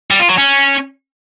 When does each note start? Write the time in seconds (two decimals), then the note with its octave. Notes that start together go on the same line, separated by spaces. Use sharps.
0.11 G3
0.20 F4
0.29 F#3
0.38 C#4